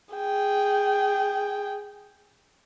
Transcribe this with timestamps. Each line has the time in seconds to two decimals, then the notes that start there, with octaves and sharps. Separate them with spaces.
0.14 G#4 G5